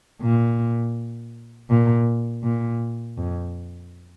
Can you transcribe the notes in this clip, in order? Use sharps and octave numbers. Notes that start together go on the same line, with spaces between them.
A#2
A#2
A#2
F2